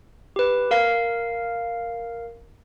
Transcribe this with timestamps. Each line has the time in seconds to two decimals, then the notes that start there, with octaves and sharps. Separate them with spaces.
0.36 G4 B4
0.71 A#4 F5